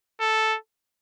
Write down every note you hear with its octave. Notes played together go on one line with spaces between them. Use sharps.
A4